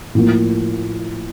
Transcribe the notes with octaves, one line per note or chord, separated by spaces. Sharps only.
A2 F3 A#3